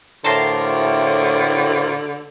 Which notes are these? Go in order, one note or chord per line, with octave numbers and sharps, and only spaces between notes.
A2 D3 F4 A#4 C5 A5 A#5 C6